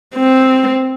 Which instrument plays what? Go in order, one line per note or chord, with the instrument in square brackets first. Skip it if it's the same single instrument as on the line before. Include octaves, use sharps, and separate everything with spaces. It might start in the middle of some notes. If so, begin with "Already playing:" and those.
[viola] C4